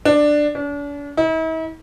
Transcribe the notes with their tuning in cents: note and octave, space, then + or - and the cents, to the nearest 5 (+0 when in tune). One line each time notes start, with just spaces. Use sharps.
D4 +10
D4 -40
E4 -45